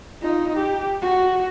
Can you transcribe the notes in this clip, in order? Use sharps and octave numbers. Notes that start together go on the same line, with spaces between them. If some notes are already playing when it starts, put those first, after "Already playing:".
D#4 F4
G4
F#4